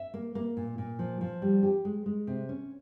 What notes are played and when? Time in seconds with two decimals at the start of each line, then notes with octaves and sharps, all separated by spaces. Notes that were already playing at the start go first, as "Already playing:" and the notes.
Already playing: E5
0.14 A#3
0.35 A#3
0.57 A#2
0.78 A#2
0.99 F3
1.21 F3
1.42 G3
1.63 G4
1.85 G#3
2.06 G#3
2.27 C3
2.49 C#4